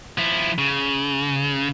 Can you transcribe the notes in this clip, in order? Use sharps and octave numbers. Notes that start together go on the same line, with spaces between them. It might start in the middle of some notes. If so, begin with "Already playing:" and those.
F3 E4
C#3